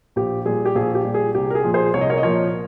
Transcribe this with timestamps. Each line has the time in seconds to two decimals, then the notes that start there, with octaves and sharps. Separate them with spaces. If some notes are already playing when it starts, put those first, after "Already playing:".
0.16 A#1 G4
0.46 A#2 G3 G#4
0.65 G4
0.75 A#1 G#4
0.95 G4
1.05 A#2 G3
1.14 G#4
1.35 C2 G4
1.50 A#4
1.55 G#4
1.64 A#2 F3
1.74 G#4 C5
1.94 C2 C#5
2.01 D#5
2.10 A#4 C#5
2.18 D#5
2.23 A#2 F3 A#4 C#5